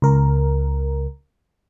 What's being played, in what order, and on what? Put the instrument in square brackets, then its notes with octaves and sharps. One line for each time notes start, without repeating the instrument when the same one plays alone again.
[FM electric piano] C#2 A#4